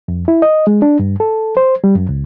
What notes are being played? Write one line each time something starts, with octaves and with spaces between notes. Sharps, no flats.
F2
E4
D#5
G#3
D4
G2
A4
C5
G3
F#2
C#2